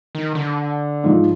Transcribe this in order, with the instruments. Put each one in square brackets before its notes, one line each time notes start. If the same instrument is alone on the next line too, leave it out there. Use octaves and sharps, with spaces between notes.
[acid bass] D#3
D3
[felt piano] G#2 F3